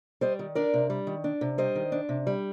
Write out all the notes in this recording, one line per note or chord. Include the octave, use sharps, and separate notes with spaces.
G3 C5 D#5
D#3
D4 A#4 D5
C3
G3
D#3
D4
C3
G3 C5 D#5
D#3
D4
C3
G3